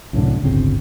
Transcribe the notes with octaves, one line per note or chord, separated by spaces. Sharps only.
C2 F#2 A2 D3
D1 G1 C#3 C4